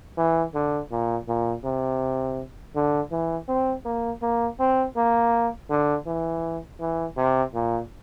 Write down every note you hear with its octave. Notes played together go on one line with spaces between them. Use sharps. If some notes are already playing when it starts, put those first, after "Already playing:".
E3
D3
A#2
A#2
C3
D3
E3
C4
A#3
A#3
C4
A#3
D3
E3
E3
C3
A#2